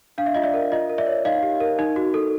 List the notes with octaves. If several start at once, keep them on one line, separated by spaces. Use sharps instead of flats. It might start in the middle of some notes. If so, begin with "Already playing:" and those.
D4 F5
E5
F4 D#5
D5 E5
A#4
F4 D#5
A#4
D5 E5
C#5
D#4 D#5 F5
G4
A#4
D#4
F#4
A4